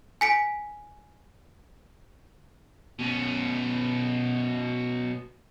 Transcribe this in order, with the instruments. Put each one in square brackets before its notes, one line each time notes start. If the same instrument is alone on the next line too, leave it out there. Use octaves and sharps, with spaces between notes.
[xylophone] G#5 B6 D7
[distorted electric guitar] B2 C#4